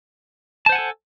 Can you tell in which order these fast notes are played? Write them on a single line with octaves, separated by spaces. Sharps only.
A5 C5 F#5 G#5 A4